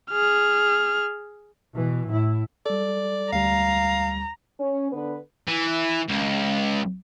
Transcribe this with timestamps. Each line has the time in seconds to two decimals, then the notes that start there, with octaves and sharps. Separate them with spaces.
0.11 G#4 F6
1.74 B2 E3
2.09 A2 E4
2.66 G3 A4 D5
3.32 D2 G3 F5 A#5
4.59 C#4
4.92 D3 B3 B4
5.48 E3
6.09 C#2